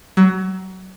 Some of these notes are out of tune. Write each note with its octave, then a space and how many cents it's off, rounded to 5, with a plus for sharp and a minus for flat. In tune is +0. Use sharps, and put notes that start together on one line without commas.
F#3 +25